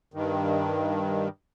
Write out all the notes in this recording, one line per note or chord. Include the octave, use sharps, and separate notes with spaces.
G2 D#3